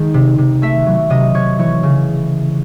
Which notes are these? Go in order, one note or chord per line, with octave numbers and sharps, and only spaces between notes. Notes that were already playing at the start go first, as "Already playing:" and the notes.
Already playing: D#3 G#3
C3
C3
A3 E5
F#3
C3 D#5
C3 C#5
E3 C#5
C#3